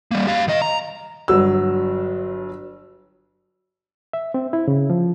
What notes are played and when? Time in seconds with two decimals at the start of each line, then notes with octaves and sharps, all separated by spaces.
0.11 G3 A#3
0.27 G4 F5
0.48 D#3 D#5
0.62 A#5
1.28 G1 F#3 E6
4.13 E5
4.34 C4
4.53 E4
4.68 C#3
4.90 F3